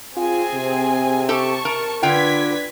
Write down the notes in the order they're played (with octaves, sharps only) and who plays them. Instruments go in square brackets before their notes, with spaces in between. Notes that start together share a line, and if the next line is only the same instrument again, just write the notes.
[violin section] C4 G#4 G#5 [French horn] F4
[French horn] C3
[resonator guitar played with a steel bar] G4 A4 [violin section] A5 C#6
[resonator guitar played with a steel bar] A#4
[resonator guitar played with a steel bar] D3 F4 G5 [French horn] D4 [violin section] B4 G#6 B6